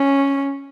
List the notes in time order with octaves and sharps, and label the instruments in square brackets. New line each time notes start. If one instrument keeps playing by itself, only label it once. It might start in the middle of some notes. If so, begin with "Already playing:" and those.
Already playing: [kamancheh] C#4